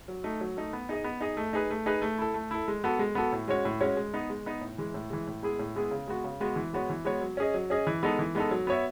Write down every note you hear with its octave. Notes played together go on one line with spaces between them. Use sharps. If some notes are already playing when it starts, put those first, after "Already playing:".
F#3
A3 D#4
F#3
A3 D#4
B3
D#4 G#4 D#5
B3
D#4 G#4 D#5
A3
D#4 G#4 B4
A3
D#4 G#4 B4
A3
E4 A4
A3
E4 A4
G#3
B3 F#4 A4
G#3
B3 F#4 A4
A2
G#3 C#4 F#4 C#5
A2
G#3 C#4 F#4 C#5
G#3
B3 D#4
G#3
B3 D#4
A2
E3 G#3
A2
E3 G#3
A2
G#3 B3 E4 G#4
A2
G#3 B3 E4 G#4
C#3
G#3 B3 F#4
C#3
G#3 B3 F#4
E3
G#3 B3 F#4 C#5
E3
G#3 B3 F#4 C#5
F#3
C#4 G#4 D#5
F#3
C#4 G#4 D#5
E3
G#3 B3 D#4 A4
E3
G#3 B3 D#4 A4
F#3
B3 F#4 C#5 E5